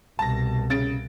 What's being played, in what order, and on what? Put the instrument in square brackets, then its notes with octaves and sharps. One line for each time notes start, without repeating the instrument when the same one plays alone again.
[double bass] C2 B2 [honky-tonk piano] A5 A#6
[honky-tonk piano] C#3 A6 D7